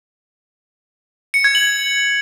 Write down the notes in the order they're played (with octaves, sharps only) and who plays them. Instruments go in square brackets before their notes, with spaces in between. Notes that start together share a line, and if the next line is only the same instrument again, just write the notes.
[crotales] C#7
G#6
F#7